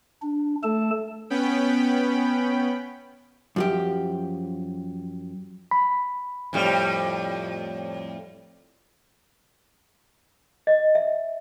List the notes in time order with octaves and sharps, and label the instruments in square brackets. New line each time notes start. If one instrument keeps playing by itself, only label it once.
[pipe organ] D4
A3 A4 A5
[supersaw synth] B3 C#4 G5 B5
[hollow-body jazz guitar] F#2 F3 G4
[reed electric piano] B5
[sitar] F2 A2 G3
[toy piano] D#5
E5